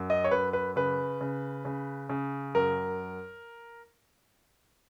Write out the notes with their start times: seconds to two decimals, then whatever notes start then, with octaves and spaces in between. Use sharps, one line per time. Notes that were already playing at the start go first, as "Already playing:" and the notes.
Already playing: F#2
0.10 D#5
0.24 C#5
0.31 F#2 B4
0.53 B4
0.76 C#3 B4
1.21 C#3
1.65 C#3
2.09 C#3
2.54 F#2 A#4